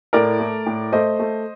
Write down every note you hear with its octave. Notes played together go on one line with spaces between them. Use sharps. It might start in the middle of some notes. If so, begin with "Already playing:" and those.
A2 A#4 D5
A3
A2
A3 C5 D#5
A3